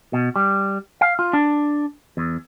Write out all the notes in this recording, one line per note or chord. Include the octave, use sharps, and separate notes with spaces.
B2
G3
F5
F4
D4
E2